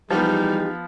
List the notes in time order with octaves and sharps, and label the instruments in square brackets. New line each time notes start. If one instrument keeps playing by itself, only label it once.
[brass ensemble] E3 G#3 G4 [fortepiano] F3 B3 [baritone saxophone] G3 [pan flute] D#4